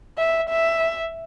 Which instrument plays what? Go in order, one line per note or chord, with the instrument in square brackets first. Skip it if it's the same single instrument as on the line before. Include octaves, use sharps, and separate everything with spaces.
[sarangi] E5
E5